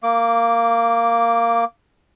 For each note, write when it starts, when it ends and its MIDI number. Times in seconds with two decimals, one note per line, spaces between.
0.03 1.65 58
0.03 1.65 86